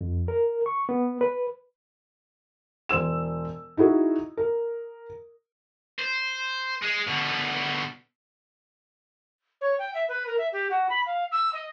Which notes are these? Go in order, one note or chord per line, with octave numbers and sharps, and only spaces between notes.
F2
A#4
C#6
B3
B4
E1 C5 E6 E7
D#4 E4 F#4 G#4
A#4
C5
G#3
B2 D3
C#5
G5
E5
B4
A#4
E5
G4
F#4
B5
F5
E6
D#5